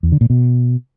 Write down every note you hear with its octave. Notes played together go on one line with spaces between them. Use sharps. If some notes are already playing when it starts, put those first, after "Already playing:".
E2
D3
A#2
B2